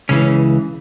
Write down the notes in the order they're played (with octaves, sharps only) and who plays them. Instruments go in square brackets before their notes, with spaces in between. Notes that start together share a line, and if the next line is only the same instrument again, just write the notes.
[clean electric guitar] C#2 C#3 E3 C#4